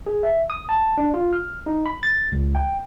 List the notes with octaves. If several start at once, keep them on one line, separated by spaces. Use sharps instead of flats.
G#4
E5
D#6
A5
D4
F4
F6
D#4
B5
A6
C#2
G5